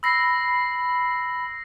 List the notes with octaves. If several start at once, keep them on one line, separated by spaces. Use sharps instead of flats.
B5 E6 A#6 C7